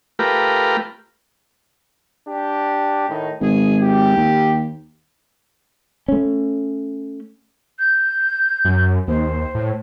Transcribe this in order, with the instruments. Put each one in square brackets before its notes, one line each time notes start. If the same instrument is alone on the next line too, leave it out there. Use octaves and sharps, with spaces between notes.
[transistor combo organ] A3 F4 G4 A#4 B4
[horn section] D4 G4
A2 D#3 D#4
[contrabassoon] G#1 [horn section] B2 G#4
[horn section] G4
[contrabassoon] D#2
[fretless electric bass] A3 C#4
[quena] G6
[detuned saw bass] F#2
[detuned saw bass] D#2 [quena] C5
[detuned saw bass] A2